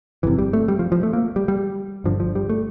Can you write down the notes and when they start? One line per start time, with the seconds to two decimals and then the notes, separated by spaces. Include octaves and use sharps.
0.23 G1 F2 C3 E3
0.38 G3
0.53 A3
0.68 G3
0.79 F3
0.92 F3
1.03 A3
1.13 A#3
1.36 G3
1.48 G3
2.04 G1 G2 D3 F3
2.20 F3
2.35 G3
2.49 A3